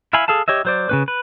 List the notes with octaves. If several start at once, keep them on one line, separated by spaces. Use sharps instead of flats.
E4 E5 F5 G#5 B5
G#4 A4 F5 A5
G4 C#5 D#5 E5
F#3 C5 D5
C#3 C#4 B4
B4